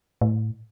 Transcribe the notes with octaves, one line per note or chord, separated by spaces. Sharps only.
A2